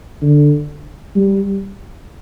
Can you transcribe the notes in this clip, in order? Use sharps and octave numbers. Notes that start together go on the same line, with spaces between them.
D3
G3